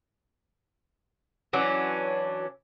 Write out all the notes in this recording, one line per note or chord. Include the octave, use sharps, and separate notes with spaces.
E3 F#3 C#4 D4